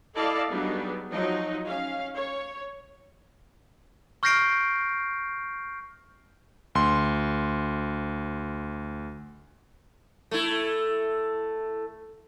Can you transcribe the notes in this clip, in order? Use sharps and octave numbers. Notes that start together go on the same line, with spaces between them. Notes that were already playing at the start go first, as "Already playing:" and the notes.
E4 A4 D5 D#5 F5 A5
F#3 G3 B3 D4 D#4 G#4
F3 F#3 D#4 D#5
C#4 F5
C#5
C#6 F6 G6 A#6 C7 D7
D2 C6
A3 E4